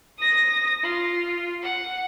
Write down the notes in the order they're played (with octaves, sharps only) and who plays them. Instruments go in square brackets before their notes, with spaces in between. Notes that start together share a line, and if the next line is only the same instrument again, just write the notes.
[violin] D#6 A#6
F4
F#5